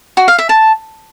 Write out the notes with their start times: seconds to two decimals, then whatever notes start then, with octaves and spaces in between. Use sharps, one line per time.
0.17 F#4
0.28 F5
0.38 E5
0.49 A5